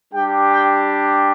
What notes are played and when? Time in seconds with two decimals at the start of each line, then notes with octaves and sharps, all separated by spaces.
0.13 G3 D4 G4 G5
0.52 G5